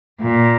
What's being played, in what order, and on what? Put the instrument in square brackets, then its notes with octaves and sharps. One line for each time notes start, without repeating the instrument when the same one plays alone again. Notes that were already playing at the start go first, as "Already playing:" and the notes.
[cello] A#2